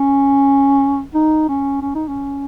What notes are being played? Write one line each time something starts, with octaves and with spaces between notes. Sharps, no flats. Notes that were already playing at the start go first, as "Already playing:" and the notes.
Already playing: C#4
D#4
C#4
C#4
D#4
C#4